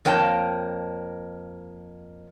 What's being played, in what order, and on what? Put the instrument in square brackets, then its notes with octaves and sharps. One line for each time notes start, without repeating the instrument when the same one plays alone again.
[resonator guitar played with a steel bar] F2 A#3 C#5 G5 A5